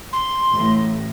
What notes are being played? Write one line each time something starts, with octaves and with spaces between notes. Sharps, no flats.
C6
A1 A2